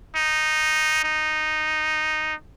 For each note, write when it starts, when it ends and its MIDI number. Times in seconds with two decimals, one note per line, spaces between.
0.16 1.01 63
1.04 2.34 63